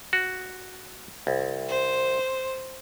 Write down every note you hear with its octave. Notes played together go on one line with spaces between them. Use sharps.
F#4
C2
C5